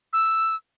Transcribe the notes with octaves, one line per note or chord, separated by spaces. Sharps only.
E6